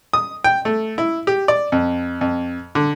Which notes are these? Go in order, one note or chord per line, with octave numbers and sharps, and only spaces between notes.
D#6
G5
A3
E4
G4
D5
F2
F2
D3